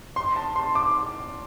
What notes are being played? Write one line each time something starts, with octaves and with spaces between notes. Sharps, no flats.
C6
A5
C6
D6